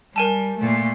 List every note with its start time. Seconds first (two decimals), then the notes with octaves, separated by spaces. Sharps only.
0.16 G3 A#4 G#5 A5
0.59 A#2 A3